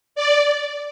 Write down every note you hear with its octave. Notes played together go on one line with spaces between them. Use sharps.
D5